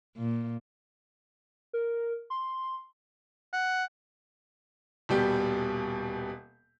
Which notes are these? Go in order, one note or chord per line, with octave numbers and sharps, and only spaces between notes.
A#2
A#4
C6
F#5
D#1 B2 G3 G4 G6